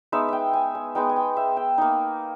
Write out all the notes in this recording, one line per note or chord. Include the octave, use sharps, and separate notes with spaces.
G#3 B3 D#4 E5
E5 G5
G#5
G#5
G#3 B3 D#4 G5
G#5
G5
E5
G5
A#3 D#4